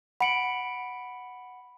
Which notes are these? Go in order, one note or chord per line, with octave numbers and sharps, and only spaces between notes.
F#5 B5 C#7 D7 F#7